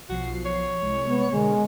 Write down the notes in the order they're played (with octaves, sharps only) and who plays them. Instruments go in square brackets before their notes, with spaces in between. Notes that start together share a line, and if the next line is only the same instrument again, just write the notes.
[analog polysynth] B1 F3 C7 [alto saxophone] F#4
[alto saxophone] C#5
[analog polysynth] C2 G#3
[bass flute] B3
[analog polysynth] B2 D3 A#4 [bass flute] G#3